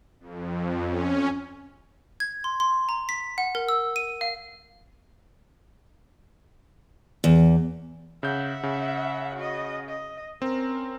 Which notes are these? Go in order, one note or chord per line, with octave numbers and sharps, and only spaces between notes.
F2
C#4
G#6
C6
C6
A#5
B6
F#5
A#4
E6
D#7
F5
E2
C#3 E5 F#5 G6
C#3
F#4 D#5
D#5
C4 C#4 A#4